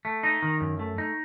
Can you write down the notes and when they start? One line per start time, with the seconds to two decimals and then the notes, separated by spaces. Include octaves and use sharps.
0.05 A3
0.23 D#4
0.42 D#3
0.61 F#2
0.79 A3
0.98 D#4